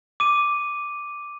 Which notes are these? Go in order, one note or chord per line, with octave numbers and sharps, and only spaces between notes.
D6 D#7